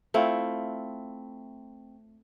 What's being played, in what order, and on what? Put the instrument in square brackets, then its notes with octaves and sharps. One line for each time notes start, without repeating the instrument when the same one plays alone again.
[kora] A3 C4 E4 F4